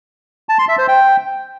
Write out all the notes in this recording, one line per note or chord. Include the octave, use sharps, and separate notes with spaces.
A5
C6
E5
C5
G5